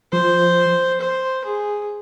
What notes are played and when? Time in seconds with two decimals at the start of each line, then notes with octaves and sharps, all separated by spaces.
0.13 F3 C5
1.01 C5
1.45 G#4